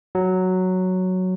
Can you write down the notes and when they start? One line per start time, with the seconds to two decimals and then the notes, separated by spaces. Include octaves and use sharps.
0.15 F#3